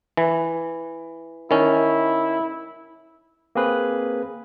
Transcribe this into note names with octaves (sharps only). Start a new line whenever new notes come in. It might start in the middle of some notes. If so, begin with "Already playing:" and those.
E3
D#3 C#4 E4
A#3 C4 G#4 B4 C5